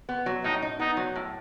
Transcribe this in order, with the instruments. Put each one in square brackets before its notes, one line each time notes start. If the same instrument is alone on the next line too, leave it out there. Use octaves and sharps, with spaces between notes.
[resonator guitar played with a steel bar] B3
F#3
[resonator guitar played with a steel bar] A2 [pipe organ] D#4
[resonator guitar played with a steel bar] D#4
[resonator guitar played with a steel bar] B3 [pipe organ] D#4
[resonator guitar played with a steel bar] F#3
A2